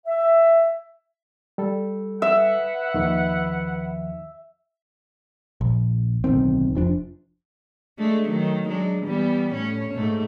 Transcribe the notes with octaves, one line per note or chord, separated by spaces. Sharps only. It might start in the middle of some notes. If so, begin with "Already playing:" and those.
E5
G3 A4
B4 E5 F#5
D#2 D#3 F3
A#1
D1 B1 D#3 C4
F1 F3 D4
G#3 A3 D4
D#3 F#3 A3
F#3 G#3 D4
E3 G3 B3
A2 C#4 C#5
G#2 A3